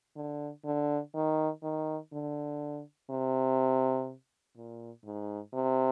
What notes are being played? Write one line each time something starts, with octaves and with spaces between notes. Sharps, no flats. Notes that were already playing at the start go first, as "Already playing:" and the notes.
D3
D3
D#3
D#3
D3
C3
A#2
G#2
C3